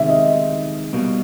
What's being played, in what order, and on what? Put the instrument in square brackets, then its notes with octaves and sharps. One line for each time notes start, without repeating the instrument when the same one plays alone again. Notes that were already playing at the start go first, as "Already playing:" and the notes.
Already playing: [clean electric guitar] C3 D#3 G#3 [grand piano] E5
[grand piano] D#5
[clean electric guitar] B2 G3 A#3